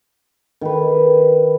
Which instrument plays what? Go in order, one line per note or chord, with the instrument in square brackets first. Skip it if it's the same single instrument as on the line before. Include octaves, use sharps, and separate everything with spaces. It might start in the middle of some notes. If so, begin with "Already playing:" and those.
[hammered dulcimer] D#3 B4